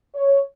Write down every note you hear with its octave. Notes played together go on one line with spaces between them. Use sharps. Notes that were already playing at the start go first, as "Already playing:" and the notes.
C#5